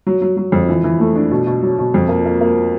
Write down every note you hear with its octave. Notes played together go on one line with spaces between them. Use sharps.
F#3
F#3
F#3
F2
E3
E3
A3
D4
B2
B2
F#3
B2
F2
A#3
A#3
A#3